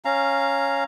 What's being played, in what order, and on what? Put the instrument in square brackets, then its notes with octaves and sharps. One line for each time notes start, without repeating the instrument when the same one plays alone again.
[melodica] C#4 F5 A#5